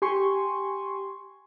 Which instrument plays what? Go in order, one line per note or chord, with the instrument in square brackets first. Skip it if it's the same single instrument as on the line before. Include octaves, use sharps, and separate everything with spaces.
[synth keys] G4 G#5 C6 C#6